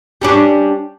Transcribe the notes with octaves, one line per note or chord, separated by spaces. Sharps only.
G3 C#4 D4